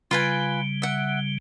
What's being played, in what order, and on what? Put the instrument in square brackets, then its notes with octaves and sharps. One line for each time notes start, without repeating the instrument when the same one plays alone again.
[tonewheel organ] C#3 G3 [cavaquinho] F4 B4 G#5
[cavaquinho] E5 F#5